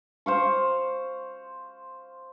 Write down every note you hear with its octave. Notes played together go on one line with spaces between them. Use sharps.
C5 F5 C#6